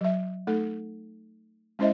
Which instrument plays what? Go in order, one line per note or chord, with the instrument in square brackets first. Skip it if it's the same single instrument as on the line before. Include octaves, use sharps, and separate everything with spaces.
[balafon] F#3 E5
A3 D#4 A4
G#3 C#4 E4 C5 D#5 E5